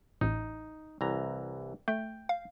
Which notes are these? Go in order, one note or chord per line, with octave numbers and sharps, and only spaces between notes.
A1 A2 D#4
C2 E3 A#5
A3 G5
F5